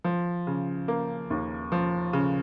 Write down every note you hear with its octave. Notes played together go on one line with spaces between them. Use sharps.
F3
C#3
A#3
D#2
F3
C#3